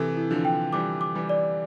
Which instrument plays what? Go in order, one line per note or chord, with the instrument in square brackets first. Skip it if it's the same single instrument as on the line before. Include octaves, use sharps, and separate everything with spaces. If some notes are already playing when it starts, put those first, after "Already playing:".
Already playing: [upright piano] C3 E3 [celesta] A4
[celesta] E4
[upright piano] D3 F3
[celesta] G5
[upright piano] E3 G3 [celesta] D6
[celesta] D6
[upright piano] E3 G3
[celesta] D5